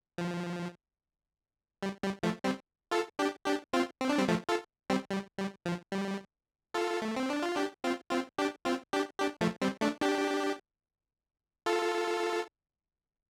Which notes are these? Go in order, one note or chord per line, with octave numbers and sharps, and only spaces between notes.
F3
G3
G3
F3 A3
G3 C4
F4 A4
D4 G4
D4 G4
C4 F4
C4
D4
G3 C4
F3 A3
F4 A4
G3 C4
G3
G3
F3
G3
F4 A4
A3
C4
D4
F4
D4 G4
C4 F4
C4 F4
D4 G4
C4 F4
D4 G4
D4 G4
F3 A3
G3 C4
A3 D4
D4 G4
F4 A4